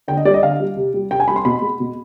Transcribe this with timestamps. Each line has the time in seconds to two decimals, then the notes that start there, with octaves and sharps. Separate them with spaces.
0.08 D3 G5
0.17 D#5
0.25 G3 D5
0.34 D#5
0.42 D3 F5
0.60 G3
0.76 C3
0.94 G3
1.10 C3 G5
1.20 G#5
1.28 G3 B5
1.36 C6
1.45 B2 B5
1.62 G#3
1.80 B2